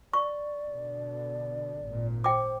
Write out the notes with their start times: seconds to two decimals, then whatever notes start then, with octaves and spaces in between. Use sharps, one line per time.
0.13 D5 C#6
0.70 B2 D3
1.82 G#1 A#2
2.24 C5 G5 D6